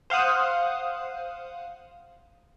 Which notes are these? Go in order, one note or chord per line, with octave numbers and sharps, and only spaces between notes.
C5 F5 F#5 D#6 F#6